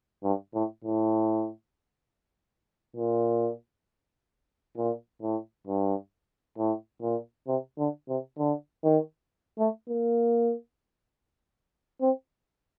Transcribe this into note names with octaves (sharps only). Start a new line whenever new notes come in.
G2
A2
A2
A#2
A#2
A2
G2
A2
A#2
C3
D3
C3
D3
D#3
A3
A#3
C4